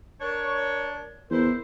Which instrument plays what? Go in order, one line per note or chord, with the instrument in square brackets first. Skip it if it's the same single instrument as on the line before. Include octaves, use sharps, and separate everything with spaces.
[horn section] D4 A#4 C#5
[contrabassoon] E2 [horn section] E4 A#4 C5